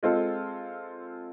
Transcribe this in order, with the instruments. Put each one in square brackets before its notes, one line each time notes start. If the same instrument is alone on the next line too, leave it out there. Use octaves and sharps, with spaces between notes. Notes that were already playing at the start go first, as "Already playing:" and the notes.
[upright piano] G#3 C4 F4 A4